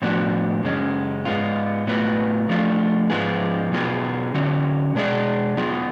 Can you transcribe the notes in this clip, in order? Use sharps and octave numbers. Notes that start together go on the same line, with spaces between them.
A2 F3 B3 D4 F#4
F#2 C#3 G#3 C#4
G#2 G#3 B3 F4
A2 F#3 B3 F4 B4
F3 A3 D4 F4
G#2 F3 B3 F4 G#4
B2 F#3 B3 F4 G#4
D3 F#3 C#4
B2 G#3 D4 G#4 D5
F#3 B3 F4 G#4